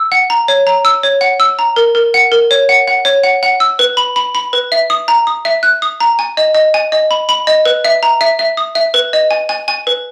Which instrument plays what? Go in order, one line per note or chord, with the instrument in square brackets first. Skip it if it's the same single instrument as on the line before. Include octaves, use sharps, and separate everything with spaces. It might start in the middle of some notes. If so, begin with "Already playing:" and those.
Already playing: [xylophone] E6
F#5
A#5
C#5
A#5
E6
C#5
F#5
E6
A#5
A#4
A#4
F#5
A#4
C#5
F#5
F#5
C#5
F#5
F#5
E6
B4
B5
B5
B5
B4
E5
D#6
A#5
D#6
E5
F#6
D#6
A#5
G#5
D#5
D#5
G#5
D#5
B5
B5
D#5
B4
E5
A#5
E5
E5
D#6
E5
B4
D#5
G#5
G#5
G#5
B4